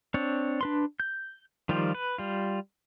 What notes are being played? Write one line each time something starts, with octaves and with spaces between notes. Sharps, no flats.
C4 D4 C#5
D4 B4 C6
G6
D#3 F3 G3 F4 G4
B4
G3 F4